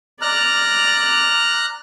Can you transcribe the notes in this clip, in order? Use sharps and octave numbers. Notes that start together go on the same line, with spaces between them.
D5 A#5 F6 F#6